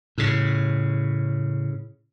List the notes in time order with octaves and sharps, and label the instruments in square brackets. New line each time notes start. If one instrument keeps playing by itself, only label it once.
[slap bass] A2 C#3